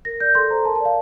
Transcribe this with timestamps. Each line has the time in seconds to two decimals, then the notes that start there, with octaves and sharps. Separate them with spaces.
0.05 A#4 A#6
0.20 D5 G6
0.35 A4 C6
0.50 C5 A#5
0.65 A#4 A5
0.75 A5
0.80 D5
0.85 F5